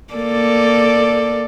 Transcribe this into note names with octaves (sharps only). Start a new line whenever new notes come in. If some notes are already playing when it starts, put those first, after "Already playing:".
A#3 A4 D5